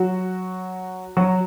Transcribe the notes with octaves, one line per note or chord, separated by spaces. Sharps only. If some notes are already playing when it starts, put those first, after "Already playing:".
Already playing: F#3 F#4
F#3 F#4